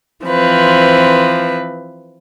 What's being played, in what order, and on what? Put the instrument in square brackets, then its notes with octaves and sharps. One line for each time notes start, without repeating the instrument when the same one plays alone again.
[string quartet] E3 F3 C4 B4